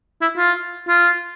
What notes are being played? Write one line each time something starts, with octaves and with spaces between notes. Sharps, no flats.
E4
F4
F4